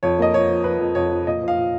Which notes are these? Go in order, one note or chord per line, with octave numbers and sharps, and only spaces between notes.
F2 C#5
A#3 D#5
F3 C#5
F3
F3 B4
F2
F2 C#5
F3
A#2 D#5
F3
F5
A#2